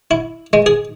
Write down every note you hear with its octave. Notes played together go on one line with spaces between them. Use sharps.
E4
G#3
G#4